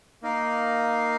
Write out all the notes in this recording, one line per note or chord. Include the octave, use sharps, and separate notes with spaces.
A#3 D#4 A#4 F5